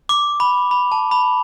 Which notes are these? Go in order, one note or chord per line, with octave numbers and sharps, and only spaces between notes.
D6
B5
B5
A5
B5